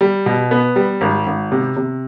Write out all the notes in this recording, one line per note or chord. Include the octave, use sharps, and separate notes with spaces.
G3
B2
B3
G3
G#1
G#1
C3
C3